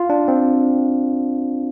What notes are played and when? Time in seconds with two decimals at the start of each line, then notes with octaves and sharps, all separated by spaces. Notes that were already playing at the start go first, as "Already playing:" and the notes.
Already playing: F4
0.10 D4
0.28 C4